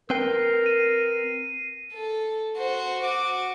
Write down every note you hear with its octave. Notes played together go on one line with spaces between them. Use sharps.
C4 A#4 B4 G5 C7
D#7
A4
F#4 C5
F#4 D6